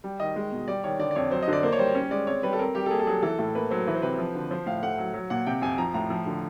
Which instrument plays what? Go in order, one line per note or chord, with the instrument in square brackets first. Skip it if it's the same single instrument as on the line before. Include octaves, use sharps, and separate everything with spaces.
[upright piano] G3
[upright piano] D#3 [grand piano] D#5
[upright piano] G#3
B2
[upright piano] G3 [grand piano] D5
[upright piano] D#3 [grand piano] C#5
[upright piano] D3 [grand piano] D5
[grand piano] D5
[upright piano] F2 [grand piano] C#5
[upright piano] F#3 [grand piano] C5
[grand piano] D#5
[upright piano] D3 [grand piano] D5
[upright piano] A#3 [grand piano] C5
[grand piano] C#5
[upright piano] G3 [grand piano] C5
[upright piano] C#4
[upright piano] G#3 [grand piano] D5
[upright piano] C4 [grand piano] C#5
[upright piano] G3 [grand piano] B4
[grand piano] A4
[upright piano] C4 [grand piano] A#4
[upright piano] G3 [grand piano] G4
[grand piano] A4
[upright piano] A#3 [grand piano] G#4
[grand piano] A4
[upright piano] F#3 [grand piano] G#4
[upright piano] E3 [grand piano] A4
[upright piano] A2 [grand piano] A4
[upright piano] A#3 [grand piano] B4
[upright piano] F#3 [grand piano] C5
[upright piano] E3 [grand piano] B4
[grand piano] C5
[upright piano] C3 [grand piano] B4
[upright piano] F3
D3
[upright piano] F3 [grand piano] C5
[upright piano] A2 [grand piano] F5
[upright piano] A3 [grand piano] F#5
[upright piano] F#3
F#3
[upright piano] A#2 [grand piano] F#5
[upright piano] C3 [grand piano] G5
[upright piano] F2 [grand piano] G#5
[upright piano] F3 [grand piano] A#5
[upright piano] A2 [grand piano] A#5
[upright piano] F3
D3